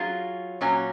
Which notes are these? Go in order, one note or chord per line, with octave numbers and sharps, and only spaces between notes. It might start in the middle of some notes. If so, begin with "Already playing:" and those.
Already playing: F#3 C#4 F4 G#4
A#2 F#3 C#4